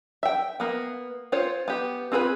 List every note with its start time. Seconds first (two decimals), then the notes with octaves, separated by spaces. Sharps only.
0.23 E5 G5
0.60 A#3 B3
1.32 F4 C5 C#5
1.68 B3 G4
2.12 C4 F4 G#4 A#4 B4